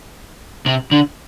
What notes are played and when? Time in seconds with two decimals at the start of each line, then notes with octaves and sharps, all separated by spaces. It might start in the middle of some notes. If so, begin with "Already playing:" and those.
0.66 C3
0.91 D3